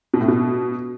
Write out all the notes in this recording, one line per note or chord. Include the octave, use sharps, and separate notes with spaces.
B2
A2
B2